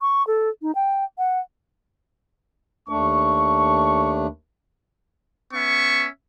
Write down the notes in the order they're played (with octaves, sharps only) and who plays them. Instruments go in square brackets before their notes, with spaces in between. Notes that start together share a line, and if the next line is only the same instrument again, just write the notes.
[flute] C#6
A4
D#4
G5
F#5
[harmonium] D#2 A3 D4 [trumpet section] C#6
[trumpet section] B3 C#4 E5 C#6